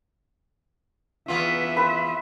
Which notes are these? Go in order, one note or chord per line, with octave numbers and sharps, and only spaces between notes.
E2 B3 F4 E5
B4 C6